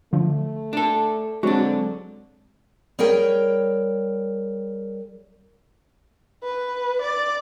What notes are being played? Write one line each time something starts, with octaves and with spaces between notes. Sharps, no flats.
D3 F3 A3
D4 A4
D3 F#3 G#3 C4 D4 F#4
G3 G#4 A#4 C#5 G5
B4
D5